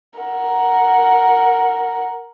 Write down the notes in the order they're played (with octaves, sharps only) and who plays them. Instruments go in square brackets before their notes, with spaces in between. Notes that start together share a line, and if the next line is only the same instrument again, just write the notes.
[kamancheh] A#4 F#5